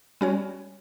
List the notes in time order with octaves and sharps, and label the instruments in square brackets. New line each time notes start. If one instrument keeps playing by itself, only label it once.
[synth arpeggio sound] G3 C#4 F#4 C#5